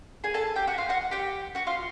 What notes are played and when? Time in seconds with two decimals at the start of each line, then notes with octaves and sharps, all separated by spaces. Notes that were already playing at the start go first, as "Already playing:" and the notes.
0.24 G#4 G#5
0.34 A4 A5
0.56 G4 G5
0.67 F#4 F#5
0.78 F4 F5
0.89 F#4 F#5
1.11 G4 G5
1.55 F#4 F#5
1.67 F4 F5